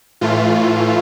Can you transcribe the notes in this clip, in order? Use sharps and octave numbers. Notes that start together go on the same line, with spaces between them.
A2 E3 A3 F4